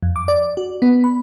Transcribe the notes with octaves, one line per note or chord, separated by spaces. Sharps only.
F2
D6
D5
F#4
B3
B5